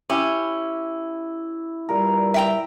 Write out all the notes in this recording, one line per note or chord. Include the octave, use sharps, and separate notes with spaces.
C#4 E4 G4
G2 A#2 G3 A#4
E5 G5 A#5